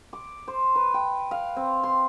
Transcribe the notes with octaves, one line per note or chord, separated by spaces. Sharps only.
D6
C5
B4
G5
F5
C4
C6